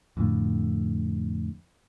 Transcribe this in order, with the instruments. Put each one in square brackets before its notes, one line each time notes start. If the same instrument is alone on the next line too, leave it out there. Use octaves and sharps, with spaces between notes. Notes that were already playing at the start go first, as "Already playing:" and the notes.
[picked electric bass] F2 A2 D3